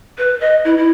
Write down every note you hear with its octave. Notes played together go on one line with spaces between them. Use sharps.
B4
D#5
E4
E4